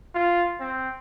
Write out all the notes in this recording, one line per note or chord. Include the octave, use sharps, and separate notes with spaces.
F4
C4